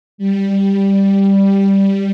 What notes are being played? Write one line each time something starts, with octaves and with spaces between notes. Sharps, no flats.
G3